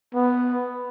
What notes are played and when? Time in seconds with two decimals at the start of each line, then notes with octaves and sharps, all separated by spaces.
0.14 B3